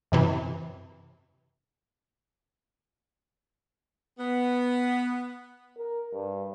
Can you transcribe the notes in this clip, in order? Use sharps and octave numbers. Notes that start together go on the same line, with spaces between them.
F#2 C3 E3
B3
A#4
G2